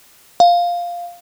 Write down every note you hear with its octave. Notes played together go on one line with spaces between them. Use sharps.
F5